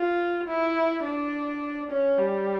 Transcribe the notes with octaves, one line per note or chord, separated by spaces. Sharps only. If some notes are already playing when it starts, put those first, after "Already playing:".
Already playing: F4
E4
D4
C#4
G3